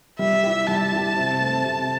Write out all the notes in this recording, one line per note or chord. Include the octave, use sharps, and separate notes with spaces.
G3 E5
E4 G4
G3 A5
E4 G4
C3
A3 C4
C3